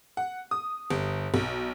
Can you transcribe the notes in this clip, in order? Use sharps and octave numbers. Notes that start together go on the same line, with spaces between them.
F#5
D#6
G1
B1